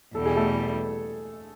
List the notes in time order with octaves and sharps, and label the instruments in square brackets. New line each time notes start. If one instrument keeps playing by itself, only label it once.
[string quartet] E2 B2 G3 [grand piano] A4
[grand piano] G#4
A3 A4